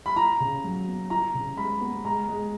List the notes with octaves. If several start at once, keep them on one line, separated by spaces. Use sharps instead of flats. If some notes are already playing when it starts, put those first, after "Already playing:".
B5
E4 A#5
C#3
F#3
B3
E4 A#5
C#3
G#3 B5
B3
G#3 A#5
G#3